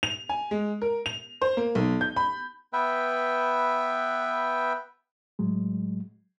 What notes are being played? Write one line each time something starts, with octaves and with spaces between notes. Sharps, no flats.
F7
G#5
G#3
A#4
F7
C5
A#3
B1
G6
B5
B3 B4 E5 G5
A2 F#3 G#3